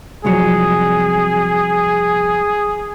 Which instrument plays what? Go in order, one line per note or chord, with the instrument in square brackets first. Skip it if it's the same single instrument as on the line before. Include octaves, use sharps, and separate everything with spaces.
[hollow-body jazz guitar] C2 F2 F#3 [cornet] G#4